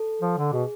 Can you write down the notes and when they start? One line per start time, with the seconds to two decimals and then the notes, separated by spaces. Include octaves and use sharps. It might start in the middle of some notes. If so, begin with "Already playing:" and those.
Already playing: A4
0.22 F3
0.38 D3
0.53 B2 G#4